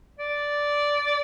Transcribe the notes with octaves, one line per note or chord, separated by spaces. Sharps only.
D5